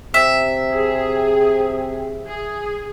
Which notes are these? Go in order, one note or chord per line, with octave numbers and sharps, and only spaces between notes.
C3 C4 E5
G#4
G#4